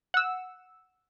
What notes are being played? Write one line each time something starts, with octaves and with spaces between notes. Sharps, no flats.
F#5 E6